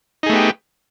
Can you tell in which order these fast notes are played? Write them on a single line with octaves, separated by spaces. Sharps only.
D#4 G#4 A3 B3 G4